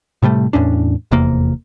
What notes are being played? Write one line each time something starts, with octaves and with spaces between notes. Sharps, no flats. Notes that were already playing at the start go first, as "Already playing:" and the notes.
A2 C3 G3 A3
E2 A2 C#4 D4
F1 E2 C3 A#3